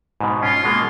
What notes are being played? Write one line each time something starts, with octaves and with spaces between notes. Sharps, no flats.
G#2 B2
C#4 F4
B2 G#3 A#3